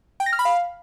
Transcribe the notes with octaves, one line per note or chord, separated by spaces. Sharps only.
G5
A#6
F6
B5
F5